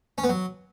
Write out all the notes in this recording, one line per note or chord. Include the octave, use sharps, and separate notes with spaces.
C#4
B3
F#3